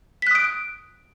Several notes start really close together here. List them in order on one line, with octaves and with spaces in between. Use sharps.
B6 F#6 D#6 D7